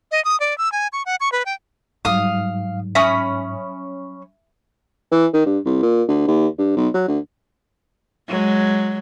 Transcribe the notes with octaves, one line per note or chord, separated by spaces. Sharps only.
D#5
D#6
D5
E6
G#5
C#6
F#5
C#6
B4
G5
G#2 F#3 G3 F5 D#6
C#4 E5 G#5 B5 D#6
E3
D#3
G2
C2
A#2
D2
D#2
G2
B1
F#3
D2
F#3 G#3